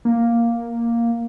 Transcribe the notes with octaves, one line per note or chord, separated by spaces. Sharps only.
A#3